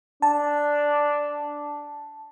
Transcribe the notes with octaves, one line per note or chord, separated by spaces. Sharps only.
D4 A5